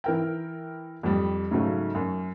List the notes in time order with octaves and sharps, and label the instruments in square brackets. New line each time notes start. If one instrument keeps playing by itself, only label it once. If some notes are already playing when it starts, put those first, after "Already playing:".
[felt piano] E3 A#4 G5
F2 G3
G#2 C#3 F#3 A3
F#2